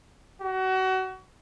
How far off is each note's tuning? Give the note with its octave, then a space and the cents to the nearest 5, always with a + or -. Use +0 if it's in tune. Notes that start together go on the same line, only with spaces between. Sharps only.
F#4 +30